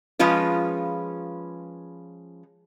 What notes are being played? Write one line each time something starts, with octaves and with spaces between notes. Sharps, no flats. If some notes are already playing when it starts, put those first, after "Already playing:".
F3 G#3 C#4 F4 B4